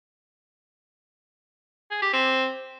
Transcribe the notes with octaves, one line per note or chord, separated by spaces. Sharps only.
G#4
G4
C4